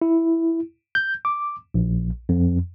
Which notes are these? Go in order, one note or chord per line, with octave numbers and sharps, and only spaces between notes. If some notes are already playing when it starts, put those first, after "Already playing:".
E4
G6
D6
A#1
F2